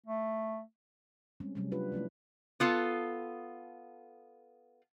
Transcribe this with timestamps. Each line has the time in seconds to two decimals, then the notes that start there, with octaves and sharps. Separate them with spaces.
0.06 A3
1.40 G3 G#3 C4 C#4
1.55 C3 F#3 G3 A3 C#4
1.72 D4 F4 G4 B4
1.92 F3 A3 C#4 E4
2.60 B3 F4 A4